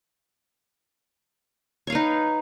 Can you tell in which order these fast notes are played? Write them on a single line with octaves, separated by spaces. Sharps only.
C#5 F5 B4 D#4